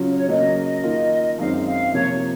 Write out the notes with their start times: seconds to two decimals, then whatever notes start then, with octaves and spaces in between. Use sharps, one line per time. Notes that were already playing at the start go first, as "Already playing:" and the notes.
Already playing: C#3 F#3 C#4 F4
0.11 C#5
0.28 C#3 F#3 A#3 D#5
0.56 D#5
0.83 D#3 A#3 F4
1.38 F#2 D#3 G#3 C4 D#4 F5
1.67 F5
1.94 C3 F3 A#3 C#5